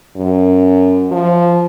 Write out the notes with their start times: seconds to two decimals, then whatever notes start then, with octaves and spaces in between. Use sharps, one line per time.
0.16 F#2
1.11 F3